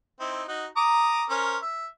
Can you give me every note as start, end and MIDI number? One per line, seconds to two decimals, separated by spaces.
0.20 0.43 60
0.20 0.43 63
0.20 0.43 64
0.48 0.66 63
0.48 0.66 66
0.77 1.25 82
0.77 1.25 86
0.77 1.25 87
1.30 1.57 61
1.30 1.57 70
1.30 1.57 72
1.62 1.86 76